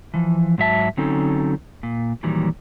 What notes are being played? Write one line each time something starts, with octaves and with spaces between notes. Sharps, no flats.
E3 F3
G#2 F#3 E5 A5
D3 F#3 C4 C#4 D#4 A4
A#2
A#2 D#3 E3 F#3 G3